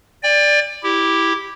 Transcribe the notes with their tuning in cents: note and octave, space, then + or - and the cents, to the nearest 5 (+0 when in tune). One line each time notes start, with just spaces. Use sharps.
D5 +0 G5 +40
E4 +0 G4 +0